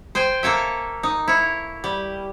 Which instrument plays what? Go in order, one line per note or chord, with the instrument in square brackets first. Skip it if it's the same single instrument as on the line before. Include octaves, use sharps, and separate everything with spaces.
[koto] C5 G5 G#5
A#3 A4 C#5 E5
D#4
E4 C#5
G3